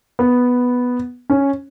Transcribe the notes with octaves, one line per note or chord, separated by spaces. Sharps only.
B3
C#4